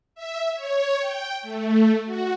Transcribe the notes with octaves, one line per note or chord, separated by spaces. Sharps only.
E5
C#5
G5
A3
F#4